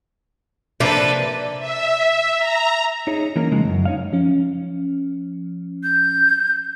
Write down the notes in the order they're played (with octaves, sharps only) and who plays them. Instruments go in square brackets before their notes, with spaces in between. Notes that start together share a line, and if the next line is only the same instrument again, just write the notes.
[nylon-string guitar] C3 E5 [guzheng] F3 A#3 D4 [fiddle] A4 B4
[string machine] E5
A#5
[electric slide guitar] D#4 G#4 C#5
E3 A#3 C#4 A#4
C#3 F3 G#3
F#2
D#4 C#5 F5
[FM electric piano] F3 C#4
[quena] G6